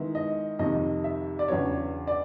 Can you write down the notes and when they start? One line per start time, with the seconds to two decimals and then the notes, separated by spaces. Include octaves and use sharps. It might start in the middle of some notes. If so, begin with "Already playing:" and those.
Already playing: D#3 G#3 B3 E4
0.15 D#5
0.59 F2 C3 D#3 D#5
1.04 E5
1.39 D5
1.48 E2 C#3 F#3 B3 D4 C#5
2.07 D5